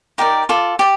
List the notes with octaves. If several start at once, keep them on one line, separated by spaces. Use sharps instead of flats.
D#4 G4 A#4 D5
F4 A4 D5
G4 D5